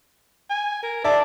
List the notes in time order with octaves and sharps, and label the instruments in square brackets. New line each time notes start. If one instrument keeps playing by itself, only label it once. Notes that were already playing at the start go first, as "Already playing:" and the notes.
[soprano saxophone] G#5
A#4
[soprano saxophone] D5 [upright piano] E5 A5